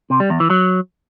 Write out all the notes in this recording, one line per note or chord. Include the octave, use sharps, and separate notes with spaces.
C3
G3
E2
E3
F#3